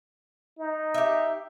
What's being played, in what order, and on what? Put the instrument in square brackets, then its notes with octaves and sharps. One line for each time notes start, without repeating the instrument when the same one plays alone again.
[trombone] D#4
[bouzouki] G4 E5